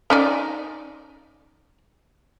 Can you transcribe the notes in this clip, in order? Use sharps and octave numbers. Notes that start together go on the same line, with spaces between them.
C#4 D#4 D5